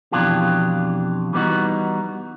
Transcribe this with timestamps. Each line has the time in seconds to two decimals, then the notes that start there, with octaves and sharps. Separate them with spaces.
0.12 F2 B2 E3 D4 F4 G4
1.33 E3 G3 B3 D#4 F#4